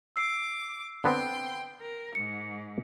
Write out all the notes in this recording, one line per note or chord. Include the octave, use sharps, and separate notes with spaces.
D6 E6 C7
D3 B3 C4 G5 C6
A#4
G#2 C#7